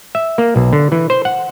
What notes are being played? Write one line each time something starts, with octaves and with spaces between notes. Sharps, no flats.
E5
A#3
B1
D3
E3
C5
F#5